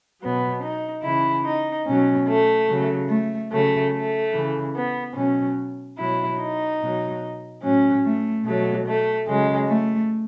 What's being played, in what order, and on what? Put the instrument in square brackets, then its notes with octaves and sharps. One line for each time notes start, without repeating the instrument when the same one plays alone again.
[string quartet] B2 F#3 B3
D#4
C#3 E3 E4
D#4
B2 F#3 C#4
A3
C#3 F#3
A3
C#3 F#3 A3
A3
C#3 E3
B3
B2 F#3 C#4
B2 F#3 E4
D#4
B2 F#3
A2 F#3 C#4
A3
B2 F#3 A3
A3
C#3 F#3 G#3
A3